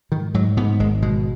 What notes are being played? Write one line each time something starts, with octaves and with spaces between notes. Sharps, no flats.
G#2 D#3
G#2 F#3
G#2 B3
G#1 G#3
B2 G#3